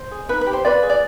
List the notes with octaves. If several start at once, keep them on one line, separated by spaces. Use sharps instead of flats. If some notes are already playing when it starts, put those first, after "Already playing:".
Already playing: C5
G#4
D#4 B4
B4
G4
C5
F4 B4 D5
G#4
D5